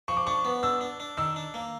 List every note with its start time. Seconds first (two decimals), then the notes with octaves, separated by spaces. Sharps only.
0.08 F3 C#6
0.17 D6
0.27 D4 C#6
0.45 B3
0.63 D4 E6
0.81 D4
1.00 D4
1.17 D#3 E6
1.36 D4
1.54 A#3